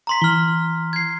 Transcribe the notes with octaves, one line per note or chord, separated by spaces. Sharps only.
A#5 C6 B6
E3 F6 G7
G#6 C7